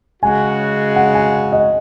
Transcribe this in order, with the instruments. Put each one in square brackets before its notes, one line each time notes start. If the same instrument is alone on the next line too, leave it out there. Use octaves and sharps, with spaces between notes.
[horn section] C#3 G#3 F#4 [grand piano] G#5
[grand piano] F#5
G#5
D#5